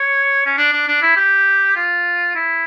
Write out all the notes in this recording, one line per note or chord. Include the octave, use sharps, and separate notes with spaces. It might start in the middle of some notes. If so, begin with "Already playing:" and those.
Already playing: C#5
C#4
D4
D4
D4
E4
G4
F4
E4